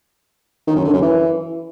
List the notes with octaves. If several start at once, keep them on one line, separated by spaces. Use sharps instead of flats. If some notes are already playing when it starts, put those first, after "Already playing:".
D#3
F#2
D3
F#2
E3